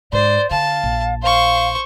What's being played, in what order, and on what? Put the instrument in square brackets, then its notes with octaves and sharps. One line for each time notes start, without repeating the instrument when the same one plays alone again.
[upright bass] G#2 [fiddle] C5 [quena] D5
[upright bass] D3 [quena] F5 [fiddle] A5
[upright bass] A#1
[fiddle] C5 C#6 [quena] F5